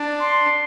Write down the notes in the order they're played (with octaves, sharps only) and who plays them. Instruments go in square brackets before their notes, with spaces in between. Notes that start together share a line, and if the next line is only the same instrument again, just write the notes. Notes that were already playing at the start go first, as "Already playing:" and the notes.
Already playing: [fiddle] D4
[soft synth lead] C6